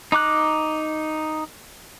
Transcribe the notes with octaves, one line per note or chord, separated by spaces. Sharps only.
D#4 A#5 D6 F#6